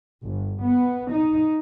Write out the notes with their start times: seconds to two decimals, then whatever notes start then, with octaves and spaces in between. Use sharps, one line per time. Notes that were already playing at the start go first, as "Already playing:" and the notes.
0.23 G1
0.62 B3
1.10 D#4